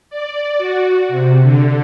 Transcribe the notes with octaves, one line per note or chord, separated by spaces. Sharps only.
D5
F#4
C3
D3